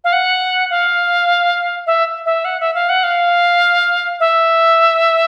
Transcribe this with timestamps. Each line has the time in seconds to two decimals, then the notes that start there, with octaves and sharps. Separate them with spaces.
0.04 F5
0.13 F#5
0.70 F5
1.87 E5
2.25 E5
2.45 F#5
2.60 E5
2.74 F5
2.89 F#5
3.04 F5
4.20 E5